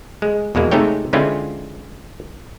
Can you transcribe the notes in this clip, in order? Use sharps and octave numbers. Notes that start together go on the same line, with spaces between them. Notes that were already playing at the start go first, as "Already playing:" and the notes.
G#3
E2 B2 G#3 A#3
C3 G#3 A3 D#4 C#5 G5
D3 G#3 C4 C#4 E4 F4